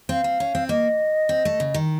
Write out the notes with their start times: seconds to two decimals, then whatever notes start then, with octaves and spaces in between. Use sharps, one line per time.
0.09 C4 F5
0.24 C4
0.40 C#4
0.55 C4
0.69 A#3 D#5
1.29 C4
1.45 A3
1.60 C#3
1.74 D#3